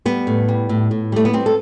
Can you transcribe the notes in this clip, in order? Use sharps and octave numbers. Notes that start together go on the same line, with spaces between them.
G3 B3
A2
G3
A2
A2
G3 A3
B3
G3 C4
A4